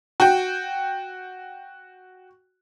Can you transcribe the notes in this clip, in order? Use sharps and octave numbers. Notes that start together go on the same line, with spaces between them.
F#4 G5